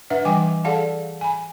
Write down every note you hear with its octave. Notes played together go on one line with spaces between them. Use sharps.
D4 B4 E5 F#5
E3 G3 G5 G#5 D6
G#4 A4 D5 F5 F#5 A5
G#5 B5